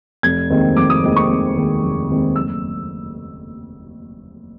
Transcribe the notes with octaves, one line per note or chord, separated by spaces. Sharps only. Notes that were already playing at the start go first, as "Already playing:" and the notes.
F1 G#6
D#2 D#3 G#3 C4
F1 D6
D#6
D#2 D#3 G#3 C4
C#6
F1
D#2 D#3 G#3 C4
F1
D#2 D#3 G#3 C4
F#1 E6